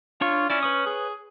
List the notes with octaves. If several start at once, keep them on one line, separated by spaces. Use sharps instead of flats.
D4 F4 C#5 C#6
C#4 E4 D5
B4 C#5 D#6
G#4